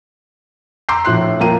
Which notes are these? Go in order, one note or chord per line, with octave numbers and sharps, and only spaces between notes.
A#5 C6 D6 E6 G6 C7
A#1 A2 C6 F#6 C7
F3 A#3 G5 A#5 D#7